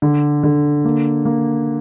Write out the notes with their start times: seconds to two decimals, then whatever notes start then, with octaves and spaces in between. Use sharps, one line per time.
0.02 D3
0.43 D3
0.85 A#3
1.25 A#3